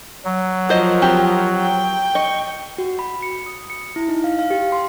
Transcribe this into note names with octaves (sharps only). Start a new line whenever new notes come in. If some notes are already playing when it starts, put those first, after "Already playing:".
F#3
F3 F#4 A#4 C5 D#5
C4 F#4 G4
G5
D#5 C#6
F#4
B5
C#7
D#6
C#7
E4
D#4
F5
F5
G4
C6